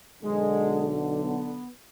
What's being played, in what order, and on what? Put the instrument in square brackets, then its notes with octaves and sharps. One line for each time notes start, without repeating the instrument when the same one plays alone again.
[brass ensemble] B1 D3 [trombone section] G#3
[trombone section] B3